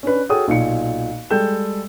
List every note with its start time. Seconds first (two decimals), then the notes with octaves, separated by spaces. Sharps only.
0.03 C#4 D4 B4
0.29 F#4 G#4 A4 C#5 G5 D#6
0.48 B1 A#2 C#7
1.30 G3 G#3 A4 G5 G6 E7